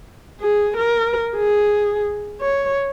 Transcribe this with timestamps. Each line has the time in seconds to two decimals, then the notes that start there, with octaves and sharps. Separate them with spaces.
0.41 G#4
0.77 A#4
1.36 G#4
2.41 C#5